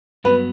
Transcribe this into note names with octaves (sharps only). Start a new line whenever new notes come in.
G2 F#3 B3 B4